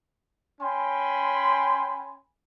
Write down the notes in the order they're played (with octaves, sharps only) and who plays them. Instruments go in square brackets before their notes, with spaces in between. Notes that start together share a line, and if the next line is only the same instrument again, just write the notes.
[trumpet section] C#4 G5 G#5 B5 C6